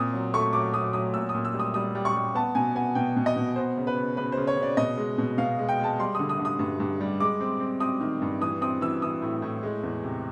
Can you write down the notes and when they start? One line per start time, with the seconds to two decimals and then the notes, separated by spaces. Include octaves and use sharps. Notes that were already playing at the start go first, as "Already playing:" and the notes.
Already playing: A#2 C4 D#6
0.13 F#3
0.34 A3 C#6
0.53 F#3 D6
0.73 F#3 D#6
0.93 F#3 D#6
1.14 A#2 E6
1.29 D#6
1.34 A#2
1.45 E6
1.54 G3
1.60 D#6
1.74 G3 D#6
1.95 G3
2.05 C#6
2.15 G3
2.35 B3 A5
2.55 B2 G#5
2.75 B3 G#5
2.95 B2 G5
3.16 B2
3.26 D#5
3.36 B2
3.56 B3 C5
3.77 C#3
3.87 B4
3.97 C#3
4.17 C#3 B4
4.32 C#3 C5
4.47 C#5
4.57 C#3
4.63 D5
4.77 B2 D#5
4.98 G#3
5.18 B2
5.38 B2 F5
5.59 G#3
5.69 G5
5.79 G#3 A5
5.99 G3 C6
6.15 D3 D#6
6.29 D#6
6.39 D3
6.45 D#6
6.59 G2
6.80 G2
7.00 G3
7.20 G#3 D6
7.40 C4
7.60 C4
7.80 C4 D#6
8.01 D#3
8.21 G2
8.41 E3 D#6
8.61 C4 D#6
8.81 E3 E6
9.02 E3 D#6
9.22 A2
9.42 A2
9.63 G#3
9.83 E2
10.04 C3